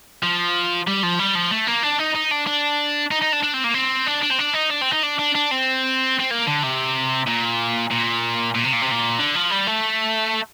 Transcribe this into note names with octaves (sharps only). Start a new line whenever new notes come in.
F3
G3
F3
G3
F3
A3
A#3
D4
D#4
D#4
D4
D4
D#4
D#4
D4
D4
C4
A#3
C4
D4
D4
C4
D4
D#4
D4
C4
D#4
D4
D4
D4
C4
C4
A#3
D3
C3
A#2
A#2
A#2
C3
A#2
C3
A#2
D3
F3
G3
A3